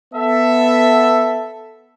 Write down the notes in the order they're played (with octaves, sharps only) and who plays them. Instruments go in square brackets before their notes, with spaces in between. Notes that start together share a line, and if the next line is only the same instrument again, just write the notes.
[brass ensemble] B3 A4 E5